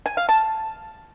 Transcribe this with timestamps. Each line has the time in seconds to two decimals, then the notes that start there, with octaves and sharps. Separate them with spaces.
0.06 G#5
0.17 F5
0.29 A5